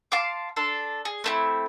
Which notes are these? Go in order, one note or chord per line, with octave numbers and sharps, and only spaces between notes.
F5 A5 C6 D6
D4 A4 C6
G#4
A3 C4 E4